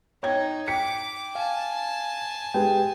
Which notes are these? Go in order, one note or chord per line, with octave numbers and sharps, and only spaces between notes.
D#4 C#5 G5 G#6
G5 D6 B6 C#7
F5 G#5 A5
G#3 G4 B4 G5